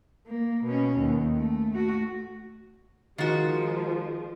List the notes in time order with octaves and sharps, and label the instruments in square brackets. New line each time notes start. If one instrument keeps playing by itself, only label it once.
[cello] A#3
B2 C#4
D#2
A3
A3 F#4
[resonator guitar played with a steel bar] D#3 F#4 [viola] F3 G#3